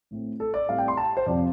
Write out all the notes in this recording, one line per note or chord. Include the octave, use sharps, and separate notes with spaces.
A2 A3 C4
A4
D5
A2 G3 C4 F5
G5
C6
A5
C5
F2 C3 F3 C4 D5